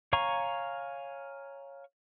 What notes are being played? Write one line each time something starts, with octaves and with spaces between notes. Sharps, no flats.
C#5 F5 G#5 A#5 C#6